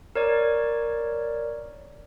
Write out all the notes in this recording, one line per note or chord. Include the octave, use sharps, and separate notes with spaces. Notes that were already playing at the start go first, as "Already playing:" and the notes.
A#4 C#5 D5